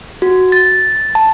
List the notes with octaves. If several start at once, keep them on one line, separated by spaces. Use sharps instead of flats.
F#4
A6
A5